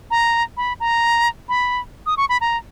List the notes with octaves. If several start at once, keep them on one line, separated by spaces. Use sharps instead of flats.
A#5
B5
A#5
B5
D#6
C#6
B5
A#5